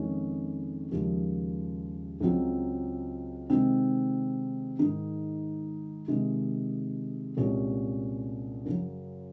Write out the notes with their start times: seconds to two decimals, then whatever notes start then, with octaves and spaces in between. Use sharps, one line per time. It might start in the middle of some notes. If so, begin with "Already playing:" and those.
Already playing: F2 D#3 G#3 C#4
0.92 D#2 C#3 F3 G#3
2.20 C#2 C#3 F#3 C4 F4
3.50 C3 D#3 G#3 C4 D#4
4.79 G#2 D#3 G#3 D#4
6.08 C3 D#3 G#3
7.37 C2 A#2 G#3 C#4 F4
8.66 F#2 C#3 F#3